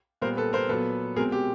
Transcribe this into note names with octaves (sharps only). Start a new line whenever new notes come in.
A#2 G3 B3 A#4 C5
A4 B4
A#4 C5
A#2 F#3 B3 A4 B4
B2 G#3 C4 G#4 A#4
G4